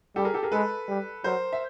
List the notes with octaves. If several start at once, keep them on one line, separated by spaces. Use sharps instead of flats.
G3 G4 A4
G#4 A#4
G4 A4
G#4 A#4
G#3 A4 B4
G3
F#3 A#4 C5
E5